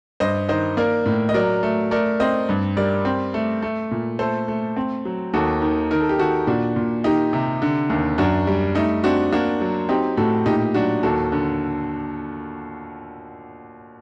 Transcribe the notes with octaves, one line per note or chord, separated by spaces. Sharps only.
G2 C5 D#5
D#3 C5 D#5
A#3 A#4 D5
A2
D#5
F#3 A#4 D5
A3
A3 A#4 D5
C4 C5 D#5
G2
G3 A#4 D5
C4
A3
A3
A#2
A3 A4 C5
A3
C4
F#3
D#2 F#4 A4
D#3
D#3 A#4
A4
G4
D#3 F#4 A4
A#2 D4 F#4
A#2
D#3 D#4 G4
C3
D3
D#2
F#2 D4 F#4
G3
A3 D#4
C4 D4 F#4
A#3 D4 F#4
F#3
C4 D#4 G4
A2 F#4 A4
A#2 D#4 G4
F#3 D4 F#4
D#2 F#4 A4
D3